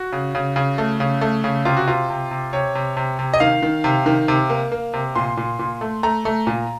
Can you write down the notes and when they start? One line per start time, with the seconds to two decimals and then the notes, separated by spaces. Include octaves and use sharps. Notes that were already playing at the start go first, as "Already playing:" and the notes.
Already playing: F#4
0.13 C#3
0.35 C#3
0.56 C#3
0.78 A3
1.00 C#3
1.21 A3
1.44 C#3
1.65 C3 F4
1.77 F#4
1.87 C3 F4
2.10 C3
2.31 C3
2.53 C3 C#5
2.75 C3
2.97 C3
3.19 C3
3.34 D#5
3.40 D#3 F5
3.63 D#3
3.84 C3
4.06 D#3
4.28 C3
4.50 A#3
4.72 A#3
4.94 C3
5.15 A#2 C6
5.37 A#2
5.59 A#2
5.81 A3
6.03 A3 A#5
6.25 A3
6.47 A#2